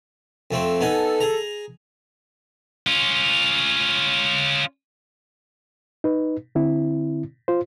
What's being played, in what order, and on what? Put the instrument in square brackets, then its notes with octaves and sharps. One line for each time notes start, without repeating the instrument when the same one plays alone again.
[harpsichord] F2 A3 C4
[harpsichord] B3 D#4 G#5 [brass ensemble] A4
[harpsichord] G#4 A#5
[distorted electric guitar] C#4 F4
[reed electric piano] D#4 B4
D3 C4 E4
F4 C5